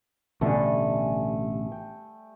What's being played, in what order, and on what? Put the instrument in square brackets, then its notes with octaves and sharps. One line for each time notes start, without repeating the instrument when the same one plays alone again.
[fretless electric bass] A1 B2 D3 [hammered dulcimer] G3 [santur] A3 G#5
[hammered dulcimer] G5